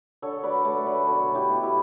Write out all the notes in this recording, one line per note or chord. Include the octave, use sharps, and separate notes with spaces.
D3 A4 C#5
F#3 B4 D5
A3 A4 C#5
D3 B4 D5
B4
B2 A4 C#5
A3
E4 G4
B2
E4 G4